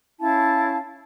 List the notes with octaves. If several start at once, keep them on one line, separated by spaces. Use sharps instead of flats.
C#4 E4 F5 A5